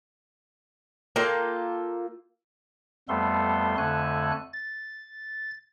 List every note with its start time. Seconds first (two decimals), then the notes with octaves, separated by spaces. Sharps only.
1.16 A#3 F4 A4 G5
3.09 F2 G3 A3 B3 A4 C6
3.78 F2 D3 A3 A4 G#5 F#6
4.53 A6